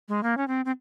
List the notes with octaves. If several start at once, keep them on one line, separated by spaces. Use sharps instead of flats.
G#3
A#3
C#4
C4
C4